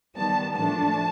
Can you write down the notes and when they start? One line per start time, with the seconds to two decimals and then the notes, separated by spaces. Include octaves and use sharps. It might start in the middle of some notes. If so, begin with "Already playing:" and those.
0.16 D#3 G3 B3 A5
0.55 A2 F3 A3 D4 A5